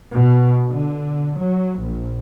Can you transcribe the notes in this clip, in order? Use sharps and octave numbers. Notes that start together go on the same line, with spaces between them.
B2
D3
F#3
A#1